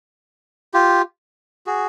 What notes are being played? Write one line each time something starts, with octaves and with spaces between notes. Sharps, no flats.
F4 G4
F#4 G#4